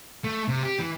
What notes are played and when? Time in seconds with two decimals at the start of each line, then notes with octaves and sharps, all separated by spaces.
0.24 A3
0.48 C3
0.63 G4
0.79 E3